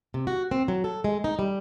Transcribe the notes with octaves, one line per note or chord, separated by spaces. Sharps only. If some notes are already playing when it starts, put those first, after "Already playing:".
C3
F#4
C4
F#3
A4
G#3
D#4
G3